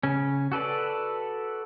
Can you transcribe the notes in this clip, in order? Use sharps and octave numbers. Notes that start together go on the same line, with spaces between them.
C#3 C#4
F#4 A4 B4 D5